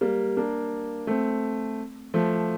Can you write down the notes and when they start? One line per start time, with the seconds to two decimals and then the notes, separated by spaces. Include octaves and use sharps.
0.01 G3 A#3
0.37 A#3 D4
1.07 A3 C4
2.14 F3 A3